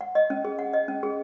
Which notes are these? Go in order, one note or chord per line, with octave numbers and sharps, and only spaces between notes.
F#5
D#5
C#4
G#4
F#5
D#5
C#4
G#4